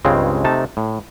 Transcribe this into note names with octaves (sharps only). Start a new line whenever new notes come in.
C#2 G2 C#3 G#3 C4
C3 A3 D#4 A5
A2